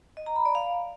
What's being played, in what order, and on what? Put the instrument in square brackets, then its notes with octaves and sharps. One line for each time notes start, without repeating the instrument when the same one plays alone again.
[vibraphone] D#5
A#5
B5
D5
F5